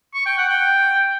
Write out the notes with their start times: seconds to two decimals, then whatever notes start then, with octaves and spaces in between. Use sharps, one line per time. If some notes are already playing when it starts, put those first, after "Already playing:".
0.14 C#6
0.26 G5
0.38 F#5
0.49 G5